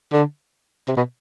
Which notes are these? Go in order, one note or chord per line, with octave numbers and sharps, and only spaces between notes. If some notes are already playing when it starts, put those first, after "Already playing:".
D3
C3
B2